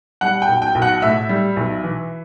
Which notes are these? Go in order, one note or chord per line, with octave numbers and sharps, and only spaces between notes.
G3 F#5
G5
B1
G5
B1
F#5
A2 E5
G3
B1
E3